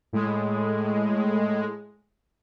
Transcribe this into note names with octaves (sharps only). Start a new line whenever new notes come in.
A2 G#3